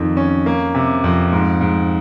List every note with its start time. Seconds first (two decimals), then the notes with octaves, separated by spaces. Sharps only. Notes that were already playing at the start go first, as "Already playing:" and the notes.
Already playing: F2 D#3
0.17 C#4
0.46 A#3
0.75 C3
1.04 F2
1.32 G#2
1.61 G#2